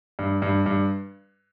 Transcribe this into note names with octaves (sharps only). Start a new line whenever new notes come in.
G2
G2
G2